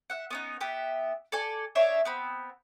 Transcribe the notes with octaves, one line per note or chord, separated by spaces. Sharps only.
E5 F#5
B3 C#4 D#4
B3 G4 E5
A4 D5 G#5
D4 D#4 C#5 E5
B3 C4 B5